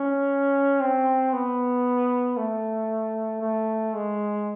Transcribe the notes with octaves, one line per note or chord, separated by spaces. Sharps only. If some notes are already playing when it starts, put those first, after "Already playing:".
Already playing: C#4
C4
B3
A3
A3
G#3